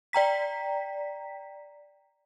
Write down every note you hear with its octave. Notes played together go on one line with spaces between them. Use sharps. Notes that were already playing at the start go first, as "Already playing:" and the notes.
D5 G5 A#5 B6